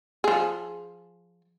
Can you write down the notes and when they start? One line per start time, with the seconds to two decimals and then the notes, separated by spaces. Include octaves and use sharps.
0.24 F3 G#4